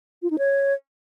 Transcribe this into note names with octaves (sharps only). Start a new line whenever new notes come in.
F4
D#4
C#5